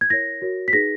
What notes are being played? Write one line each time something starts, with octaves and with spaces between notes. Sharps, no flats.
G#6
E4 A#4 C#5 A#6
F#4 A#4 C#5
B6
D#4 G#4 B4 A#6